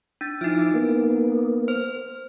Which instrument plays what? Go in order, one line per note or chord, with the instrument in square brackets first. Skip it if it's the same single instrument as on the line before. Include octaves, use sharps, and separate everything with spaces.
[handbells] D4 A6
[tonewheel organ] F3 E4 D6 [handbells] D#4 F6
[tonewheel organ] A#3 B3
[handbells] C5 F6